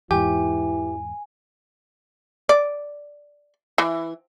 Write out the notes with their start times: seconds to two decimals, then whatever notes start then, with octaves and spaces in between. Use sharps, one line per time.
0.11 E2 G#2 E3 G4 G#5
2.49 D5
3.78 E3